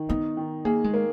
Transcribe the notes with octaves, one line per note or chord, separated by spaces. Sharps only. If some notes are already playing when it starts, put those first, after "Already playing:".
Already playing: D#3
B3 D#4
D#3
A#3 G#4
G#3
A#3